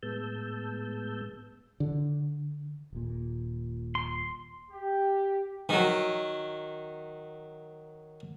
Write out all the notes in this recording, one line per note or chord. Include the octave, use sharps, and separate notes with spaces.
A2 G#3 B3 A5 E6 G6
D3
D#1 A#2
C6
G4
D#3 F#3